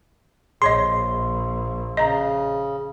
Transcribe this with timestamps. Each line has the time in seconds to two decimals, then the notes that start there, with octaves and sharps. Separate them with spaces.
0.62 A#1 G#4 C#5 D#5 C6
1.97 C#3 D#5 A#5